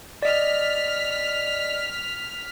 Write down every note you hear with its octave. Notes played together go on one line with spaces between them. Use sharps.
D5 D#5 F6 B6